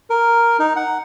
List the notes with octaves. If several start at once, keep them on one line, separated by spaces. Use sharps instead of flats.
A#4
D#4
F#5